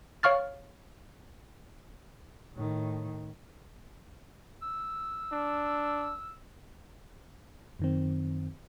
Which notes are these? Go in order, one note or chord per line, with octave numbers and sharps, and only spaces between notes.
C#5 F5 C#6 F6 A6
A2 D#3
E6
D4
F#2 D#3 C4